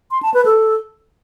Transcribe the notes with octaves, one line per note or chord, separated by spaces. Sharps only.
C6
A5
B4
A4